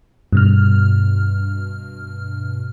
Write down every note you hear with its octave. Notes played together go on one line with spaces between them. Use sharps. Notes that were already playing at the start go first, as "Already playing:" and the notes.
G2 B2 F6